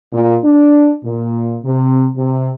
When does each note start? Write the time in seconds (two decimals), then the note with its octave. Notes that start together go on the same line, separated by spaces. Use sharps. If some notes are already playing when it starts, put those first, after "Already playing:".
0.13 A#2
0.44 D4
1.05 A#2
1.65 C3
2.16 C3